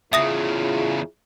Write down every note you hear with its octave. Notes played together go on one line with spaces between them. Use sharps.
E2 C#3 E4 F4 G#4 E5 D#6 A#6